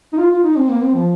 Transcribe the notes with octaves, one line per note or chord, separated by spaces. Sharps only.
D#4
F4
F4
D#4
C4
A#3
C4
F3